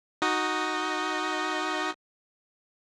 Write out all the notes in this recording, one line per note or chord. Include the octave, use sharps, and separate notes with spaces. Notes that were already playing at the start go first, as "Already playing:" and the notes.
D#4 F#4 D#5